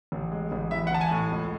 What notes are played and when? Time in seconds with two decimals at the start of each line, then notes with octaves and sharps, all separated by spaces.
0.12 A1
0.31 G#3
0.52 A1
0.71 E3 E5
0.87 F#5
0.91 A1 A5
1.01 G#5
1.11 A2
1.31 C#2